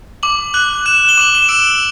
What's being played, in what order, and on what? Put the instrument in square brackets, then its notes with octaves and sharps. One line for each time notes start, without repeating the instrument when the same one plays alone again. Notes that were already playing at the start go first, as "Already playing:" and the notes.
[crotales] D6 F#7
F#6 F#7
F#6 E7
G7
D6 F#7
E7
E6 D7